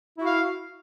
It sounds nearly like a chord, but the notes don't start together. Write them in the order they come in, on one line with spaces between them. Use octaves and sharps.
E4 F#4 F5